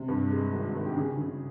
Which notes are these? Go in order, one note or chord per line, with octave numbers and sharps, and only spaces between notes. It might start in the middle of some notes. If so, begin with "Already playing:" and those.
Already playing: C3
G2
G#3
G#1
G#1
G4
C#3 G#4
C#3